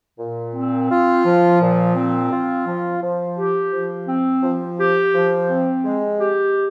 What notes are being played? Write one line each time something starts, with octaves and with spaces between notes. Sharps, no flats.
A#2
C4
F4
F3
A#2
C4
F4
F3
F3
G4
F3
C4
F3
G4
F3
C4
G#3
G4